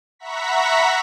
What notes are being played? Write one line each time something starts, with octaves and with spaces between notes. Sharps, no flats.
E5 F#5 A#5 B5 C#6 B6